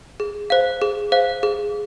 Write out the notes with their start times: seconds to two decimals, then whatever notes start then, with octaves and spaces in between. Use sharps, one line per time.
0.20 G#4
0.50 C5 F5
0.82 G#4
1.12 C5 F5
1.43 G#4